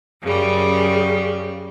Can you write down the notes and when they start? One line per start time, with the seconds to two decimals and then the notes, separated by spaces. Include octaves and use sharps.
0.21 F#2 C#3 G3